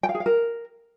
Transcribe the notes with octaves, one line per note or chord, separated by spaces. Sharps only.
G5
F5
G#4
F5
A#4